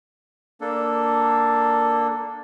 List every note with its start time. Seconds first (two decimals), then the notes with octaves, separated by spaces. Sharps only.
0.61 A#3 D4 A4